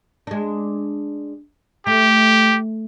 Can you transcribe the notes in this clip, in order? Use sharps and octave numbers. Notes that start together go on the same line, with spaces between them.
G#3 D4
A3 G4